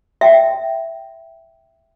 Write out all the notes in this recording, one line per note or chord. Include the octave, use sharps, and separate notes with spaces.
E5 G5